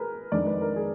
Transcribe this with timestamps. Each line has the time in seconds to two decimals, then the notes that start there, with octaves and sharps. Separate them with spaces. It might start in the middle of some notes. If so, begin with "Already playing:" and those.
Already playing: G#4 A#4 B4
0.32 F2 D#3 G#3 D4 D5
0.46 B4
0.58 B4
0.62 A#4
0.76 G#4